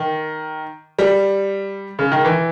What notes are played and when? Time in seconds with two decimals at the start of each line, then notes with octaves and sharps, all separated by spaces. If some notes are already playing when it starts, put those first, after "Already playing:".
Already playing: D#3
0.99 G3
1.99 C#3
2.12 D#3
2.24 E3